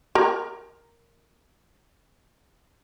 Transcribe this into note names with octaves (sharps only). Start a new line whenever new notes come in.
A#4 A#5